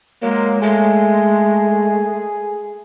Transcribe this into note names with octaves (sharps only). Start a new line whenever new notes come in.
F#3 G#3 A#3
G#3 A3 G#4